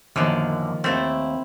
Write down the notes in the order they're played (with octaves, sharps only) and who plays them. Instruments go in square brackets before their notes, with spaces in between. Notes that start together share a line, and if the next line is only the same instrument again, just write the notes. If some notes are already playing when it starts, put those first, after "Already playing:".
[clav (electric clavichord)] F#2 B2 D3 [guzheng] D#3 F3 [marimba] A#3
[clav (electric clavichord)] D#2 A3 [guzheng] C4 E4